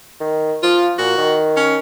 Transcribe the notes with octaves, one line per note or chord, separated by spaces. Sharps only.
D#3
F3 F4
A#2 F#4
D#3
C#4